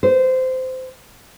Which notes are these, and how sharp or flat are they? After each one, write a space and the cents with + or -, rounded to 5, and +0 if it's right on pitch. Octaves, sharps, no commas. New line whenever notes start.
C5 -20